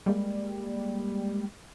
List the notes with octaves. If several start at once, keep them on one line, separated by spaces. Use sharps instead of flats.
G3 G#3 A#3